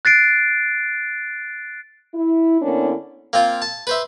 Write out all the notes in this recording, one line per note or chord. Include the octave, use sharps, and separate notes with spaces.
F#6 A6 C7 D7
E4
D3 A#3 B3 C#4 D4 E4
A#3 C4 F4
A5
B4 C5 E5